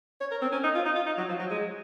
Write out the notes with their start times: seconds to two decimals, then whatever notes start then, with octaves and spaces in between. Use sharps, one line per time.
0.20 C#5
0.31 A#4
0.42 C4
0.52 C#4
0.63 D#4
0.75 F4
0.85 D#4
0.96 F4
1.06 D#4
1.17 F#3
1.28 F3
1.39 F#3
1.50 G#3